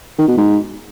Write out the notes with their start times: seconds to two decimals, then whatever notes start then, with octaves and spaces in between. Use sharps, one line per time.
0.19 D#3
0.28 B2
0.37 G#2